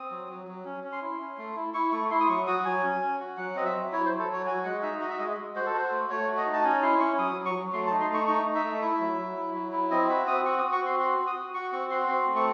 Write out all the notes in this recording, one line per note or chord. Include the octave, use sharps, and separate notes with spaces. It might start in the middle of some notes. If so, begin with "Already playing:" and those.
Already playing: C4 D#6
F#3
F#3
F#3
C#4
C#4
C6
E4
C#4
A3
E4
E4 C#6
A3 C#6
E4 C6
D#6
F#3 C#6
F#4 D#6
F#3 G#5
C#4
C#4
F#4
F#3 F#5
C4 D#5
E5
F#3
E4 C#5
C5
F#3
A4
F#3 C#5
F#4 G#5
G#3 F#5
D#4 E5
F#4 D#5
E5
G#3 D#5
G#3
F#4 C5
A4
F#4 C5
A3
A3 C#5
F#4
D#5
D#4
A5
C#4 G#5
E4 C6
C#4 C#6
F#3 D#6
F#3
C#6
F#3
A3 C6
D#4 A5
C6
A3 C#6
D#4 C#6
D#4
E5
A3
E4
F#3
F#3
E4
F#3
E4
C4 D#5
F#4 E5
C4 D#6
F#4 C#6
D#6
F#4
C#6
C4 C6
F#4 C6
F#4
D#6
F#4
F#4 C#6
C4 C#6
F#4 C6
C4 C6
A3
C#6